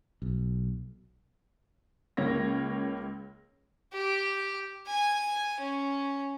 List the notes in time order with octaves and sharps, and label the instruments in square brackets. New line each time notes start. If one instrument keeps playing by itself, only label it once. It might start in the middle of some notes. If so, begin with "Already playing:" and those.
[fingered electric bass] B1
[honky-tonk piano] C#2 A#3 C#5 A#6
[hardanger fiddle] G4
G#5
C#4